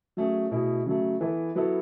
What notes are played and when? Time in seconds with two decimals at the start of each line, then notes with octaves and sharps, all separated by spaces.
0.17 F#3 A3 C#4 G#4
0.51 B2 A3 E4 G#4
0.86 C#3 F#3 A3
1.21 E3 B3 E4 A4
1.55 F#3 B3 E4 A4